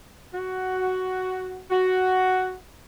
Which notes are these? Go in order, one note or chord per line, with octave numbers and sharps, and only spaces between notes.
F#4
F#4